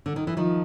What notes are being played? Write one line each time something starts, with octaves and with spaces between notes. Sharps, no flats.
D3
D#3
E3
D#3 F3